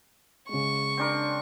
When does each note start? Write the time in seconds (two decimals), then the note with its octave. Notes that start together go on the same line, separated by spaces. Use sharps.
0.49 C#3 G#3 C#6
0.97 C4 D4 A#4